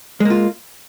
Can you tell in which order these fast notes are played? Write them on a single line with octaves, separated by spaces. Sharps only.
G#3 A#3 F4